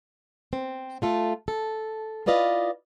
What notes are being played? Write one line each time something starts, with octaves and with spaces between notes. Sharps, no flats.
C4
A3 F4 A4
A4
E4 F4 B4 D5 D#5 F5